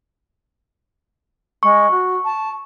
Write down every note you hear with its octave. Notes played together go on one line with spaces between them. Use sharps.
G#3 C#6
F#4
A5